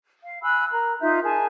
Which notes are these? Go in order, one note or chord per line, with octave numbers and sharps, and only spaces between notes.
F5
G#5 B5 E6 F#6
A#4 A#5
D#4 F4 E5 G6
G#4 A#4 G#5 A5